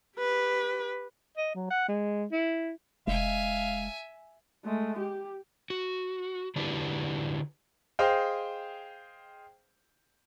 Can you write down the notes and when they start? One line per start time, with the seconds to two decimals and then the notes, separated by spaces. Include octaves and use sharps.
0.18 G4 B4
1.37 D#5
1.55 F#3
1.70 F#5
1.88 G#3
2.32 E4
3.07 F1 G#3 E5 F5 G#5
4.65 G#3 A3
4.99 G4
5.70 F#4
6.56 D3 D4 E4 F#4 G4 B4
7.99 G#4 C5 D#5 F5 G5